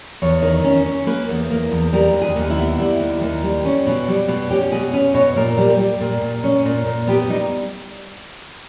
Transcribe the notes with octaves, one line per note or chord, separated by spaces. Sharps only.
E2 C#5
D#3
C#4
C#4
A#3 B4
E2
A#3
E2
G3 A#4
D#2
G#4
D#2
E4
B3
G3 E4
D#2
D#2
G3
C#4
B2
G3
B2
C#4 G4
B2 G#4
C#4 B4
B2 C#5
A#2 A#4
G3
G3
A#2
A#2
C#4
A#2
A#2
B3 G4
G3 D#4